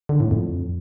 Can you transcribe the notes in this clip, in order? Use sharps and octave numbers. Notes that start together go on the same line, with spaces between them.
D3
A2
F2